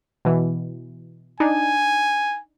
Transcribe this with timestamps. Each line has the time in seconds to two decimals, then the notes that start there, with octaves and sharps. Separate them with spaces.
0.25 B2 E3
1.40 D4 D#4 G#5